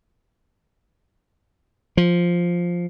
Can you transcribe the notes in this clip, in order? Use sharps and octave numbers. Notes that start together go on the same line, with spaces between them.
F3